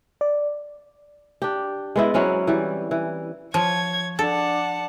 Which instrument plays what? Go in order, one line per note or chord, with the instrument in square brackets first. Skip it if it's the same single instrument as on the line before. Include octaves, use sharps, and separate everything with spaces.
[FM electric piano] D5
[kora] D4 G4
G#3 B3 E4
F#3 C4 C#4 E4
E3 G3
E3
[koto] F3 [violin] C#5 G#6
[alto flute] D4 [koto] A4 [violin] F#5 A5